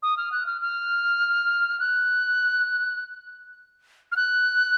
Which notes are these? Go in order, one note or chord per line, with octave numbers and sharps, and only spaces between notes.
D#6
F6
F#6
F6
F6
F#6
F6
F#6